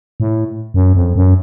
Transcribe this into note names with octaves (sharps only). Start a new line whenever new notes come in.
A2
F#2
F2
F#2